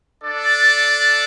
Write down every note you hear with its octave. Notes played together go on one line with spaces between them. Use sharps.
D4 A4 D5